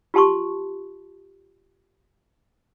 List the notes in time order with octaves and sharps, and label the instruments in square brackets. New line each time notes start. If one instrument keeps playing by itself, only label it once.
[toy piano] F4 G4 A5 C6 C#6